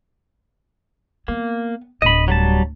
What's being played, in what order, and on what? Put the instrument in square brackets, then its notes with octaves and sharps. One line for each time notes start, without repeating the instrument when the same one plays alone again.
[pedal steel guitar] A#3 [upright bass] B3
[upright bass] D1 [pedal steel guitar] D#5 B5
[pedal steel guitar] F#3 G3 A5